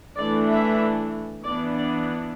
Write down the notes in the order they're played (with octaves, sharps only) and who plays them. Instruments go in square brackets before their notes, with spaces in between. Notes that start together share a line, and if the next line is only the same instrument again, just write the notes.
[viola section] E3 A3 D4 D5
E5
E3 B3 D4 D5
D5